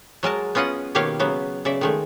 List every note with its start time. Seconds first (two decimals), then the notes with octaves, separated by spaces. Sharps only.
0.23 F#3 G#3 A#4 A5
0.55 B3 C#4 F4 D#5 F#5
0.95 B2 D#3 A#3 G4 C#5 F5
1.19 C#3 F#3 B3
1.65 C#3 D5 E5
1.81 D#3 G#3 A3